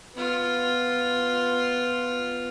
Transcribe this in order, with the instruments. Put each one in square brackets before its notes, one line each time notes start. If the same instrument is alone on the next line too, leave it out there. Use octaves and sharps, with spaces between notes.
[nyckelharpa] B3 F4